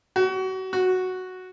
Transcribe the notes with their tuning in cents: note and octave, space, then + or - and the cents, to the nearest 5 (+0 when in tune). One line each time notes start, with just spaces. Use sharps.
F#4 +30
F#4 +0